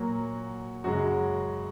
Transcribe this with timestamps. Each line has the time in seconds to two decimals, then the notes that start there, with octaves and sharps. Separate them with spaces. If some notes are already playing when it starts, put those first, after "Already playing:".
Already playing: A#2 F#3 A#3 F#4
0.84 F#2 C#3 G#3 F#4